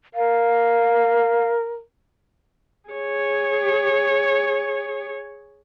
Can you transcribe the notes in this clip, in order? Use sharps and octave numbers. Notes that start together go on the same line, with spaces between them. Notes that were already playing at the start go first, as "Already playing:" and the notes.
A#4 F5
G#4 C#5